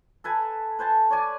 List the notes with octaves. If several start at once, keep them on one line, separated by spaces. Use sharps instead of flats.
A4 B4 G#5 A#5
B4 C5 G#5 A5
C#5 D5 G#5 D6